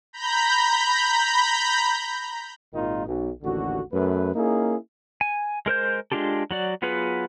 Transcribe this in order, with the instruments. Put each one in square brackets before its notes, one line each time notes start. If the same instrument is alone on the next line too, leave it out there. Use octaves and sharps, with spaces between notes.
[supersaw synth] A#5 B5 G6
[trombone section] G#1 A#2 D#3 D#4 F4
B1
A1 D#2 D3 F#4
F#2 A3 B4
A#3 C#4 D#4 E4 G#4
[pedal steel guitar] G#5
G#3 A#4 C5 G6
G#3 D4 F4 G4 A4
F#3 F#4 D5
F#3 B3 F4 G#4 B4